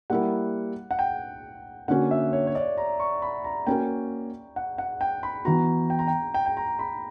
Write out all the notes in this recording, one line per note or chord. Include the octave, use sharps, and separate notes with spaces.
G3 A#3 E4 A#4 F#5
F#5
G5
D3 A#3 C#4 F#4 F#5
E5
C#5
C#5
D5
A#5
C#6
B5
A#5
A#3 C#4 F#4 A#4 G5
F#5
F#5
G5
B5
E3 B3 F#4 A#5
G5
A#5
G5
G5
G5
A#5
B5